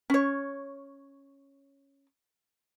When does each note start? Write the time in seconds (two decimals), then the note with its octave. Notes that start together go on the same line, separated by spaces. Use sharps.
0.10 C#4 C#5